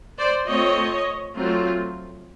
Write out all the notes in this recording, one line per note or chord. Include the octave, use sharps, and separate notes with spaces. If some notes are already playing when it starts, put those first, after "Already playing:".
C5 D5
A3 C4 F4 C#5 D#5
F#3 A3 C4 F4